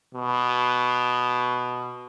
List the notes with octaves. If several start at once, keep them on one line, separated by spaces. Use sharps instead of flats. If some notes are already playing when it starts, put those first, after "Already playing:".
B2